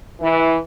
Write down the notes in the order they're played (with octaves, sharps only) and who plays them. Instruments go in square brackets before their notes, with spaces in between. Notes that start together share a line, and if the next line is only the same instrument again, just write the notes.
[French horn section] E3